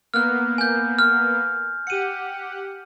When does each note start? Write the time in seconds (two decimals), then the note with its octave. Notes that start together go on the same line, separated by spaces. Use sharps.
0.14 A#3 B3 F6 F#6
0.58 G#5 G6
0.99 F6
1.87 G4 F#5 C#7 D#7